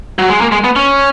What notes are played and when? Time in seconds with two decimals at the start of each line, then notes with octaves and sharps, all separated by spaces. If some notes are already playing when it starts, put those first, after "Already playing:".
0.19 F#3
0.30 G#3
0.41 A#3
0.52 G#3
0.64 B3
0.76 C#4